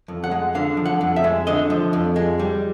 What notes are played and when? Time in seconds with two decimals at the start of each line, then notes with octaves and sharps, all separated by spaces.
0.08 F2
0.24 F#5
0.31 G#3
0.55 D3 F5
0.77 F3
0.85 F#5
1.01 F2
1.16 E5
1.24 G#3
1.47 D3 D#5
1.70 F3
1.93 F2
2.16 G#3
2.39 G3